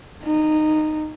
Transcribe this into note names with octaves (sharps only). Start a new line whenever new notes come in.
D#4